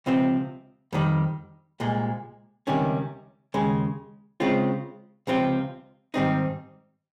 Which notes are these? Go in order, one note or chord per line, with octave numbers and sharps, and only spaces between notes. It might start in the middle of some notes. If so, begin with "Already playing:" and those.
C#2 C3 F3 C4
F2 D#3 G3
C2 A#2 G#3
C#2 C3 D#3 G3 C#4
D#2 C#3 G#3
C#3 G#3 C4 F4
C#2 C3 F3 C4 F4
G#2 D#3 G3 C4 D#4